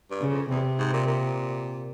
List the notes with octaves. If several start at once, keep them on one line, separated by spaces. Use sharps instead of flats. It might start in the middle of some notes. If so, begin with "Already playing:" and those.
G2
C#3
F2
E2 C3
G#2
A#2
A#2